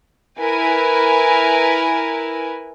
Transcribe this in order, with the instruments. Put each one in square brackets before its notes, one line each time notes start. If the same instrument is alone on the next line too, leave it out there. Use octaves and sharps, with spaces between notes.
[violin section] E4 A#4 B4 G#5